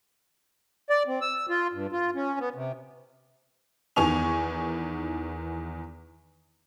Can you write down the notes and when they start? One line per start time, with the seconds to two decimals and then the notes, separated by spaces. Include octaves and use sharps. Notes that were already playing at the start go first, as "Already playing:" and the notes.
0.90 D5
1.07 C4
1.21 E6
1.49 F4
1.73 G2
1.92 F4
2.15 C#4
2.40 B3
2.55 C3
3.96 E2 D#3 B3 G#5 C#6 F7